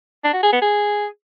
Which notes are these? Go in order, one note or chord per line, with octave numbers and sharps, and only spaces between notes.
D4
F#4
G#4
B3
G#4